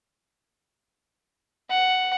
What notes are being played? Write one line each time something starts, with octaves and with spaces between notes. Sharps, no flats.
F#5